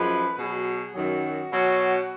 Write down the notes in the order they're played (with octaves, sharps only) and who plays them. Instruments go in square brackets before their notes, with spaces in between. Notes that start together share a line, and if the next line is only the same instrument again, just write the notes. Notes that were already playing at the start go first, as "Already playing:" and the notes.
Already playing: [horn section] F#2 F3 G#3 B4
B2 F#3 G#4
F#2 D#3 F#3 F#4
B2 F#3